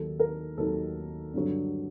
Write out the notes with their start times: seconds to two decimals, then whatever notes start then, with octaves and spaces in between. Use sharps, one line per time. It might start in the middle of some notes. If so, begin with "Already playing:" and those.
Already playing: D#2 D#3 F#3 A4
0.20 A#4
0.57 D#2 D#3 F#3 A4
1.34 G2 D3 F#3